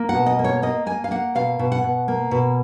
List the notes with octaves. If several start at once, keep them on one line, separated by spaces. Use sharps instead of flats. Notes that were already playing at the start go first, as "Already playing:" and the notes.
Already playing: A#3
F#5
B2
D#5
A#3
C#5
A#3 D#5
A#3 G#5
F5
A#3 F#5
B2 F5
B2
F#5
B2
A#3
B2